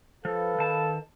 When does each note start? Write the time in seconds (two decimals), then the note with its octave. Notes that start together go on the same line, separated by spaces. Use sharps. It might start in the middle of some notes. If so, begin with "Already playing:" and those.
0.25 F3 A4 B4 F5
0.58 D#3 A5